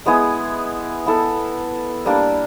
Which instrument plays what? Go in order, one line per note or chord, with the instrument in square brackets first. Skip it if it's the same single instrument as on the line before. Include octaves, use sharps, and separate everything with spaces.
[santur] G#3 B3 E4 G#4
B3 E4 A4
G3 A#3 D4